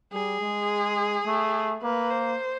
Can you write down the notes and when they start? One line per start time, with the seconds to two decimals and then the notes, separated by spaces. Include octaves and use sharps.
0.12 G3 G#4
0.41 G#3
1.26 A3
1.83 A#3 B4
2.10 C5